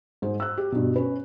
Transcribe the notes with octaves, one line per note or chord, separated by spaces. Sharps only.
G#2 G#4 C5
E6 F#6
G4
G2 B2
C#4 B4